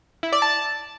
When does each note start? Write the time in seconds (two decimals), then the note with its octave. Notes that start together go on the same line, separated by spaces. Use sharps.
0.23 E4
0.33 D5
0.42 A5